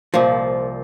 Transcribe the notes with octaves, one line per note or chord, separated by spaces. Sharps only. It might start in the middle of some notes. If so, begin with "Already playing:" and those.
C2 A#2 F3